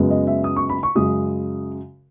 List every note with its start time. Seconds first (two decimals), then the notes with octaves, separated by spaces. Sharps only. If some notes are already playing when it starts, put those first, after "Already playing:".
Already playing: F#2 C#3 G#3 B3
0.11 D#5
0.27 E5
0.44 D#6
0.56 C#6
0.69 B5
0.83 C#6
0.95 F#2 C#3 G#3 D#6